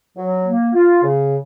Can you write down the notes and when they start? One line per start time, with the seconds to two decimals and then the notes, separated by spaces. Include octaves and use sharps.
0.16 F#3
0.45 A#3
0.74 F4
1.02 C#3